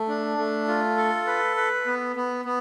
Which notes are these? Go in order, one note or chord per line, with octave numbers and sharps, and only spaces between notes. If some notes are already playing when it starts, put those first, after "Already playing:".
Already playing: A3
D4
A3
F4
A4
B4
B4
B3
B3
B3